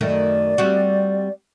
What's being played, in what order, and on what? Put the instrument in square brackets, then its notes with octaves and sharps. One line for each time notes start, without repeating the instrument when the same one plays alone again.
[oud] F#2 D#3 A3 [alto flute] D5
[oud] G3 C4 F#4